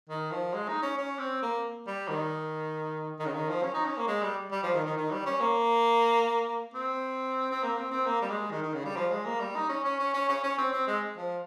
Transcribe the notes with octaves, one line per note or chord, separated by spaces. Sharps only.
D#3
F3
G#3
D#4
C#4
C#4
C4
A#3
G3
D#3
D#3
C#3
D#3
F3
C#4
D#4
C#4
A#3
G#3
G3
G3
F3
D#3
D#3
D#3
G3
C#4
A#3
C4
C4
A#3
C4
C4
A#3
G3
G#3
D#3
D#3
C#3
G3
F3
G#3
A#3
G3
D#4
C#4
C#4
C#4
C#4
C#4
C#4
C4
C4
G#3
F3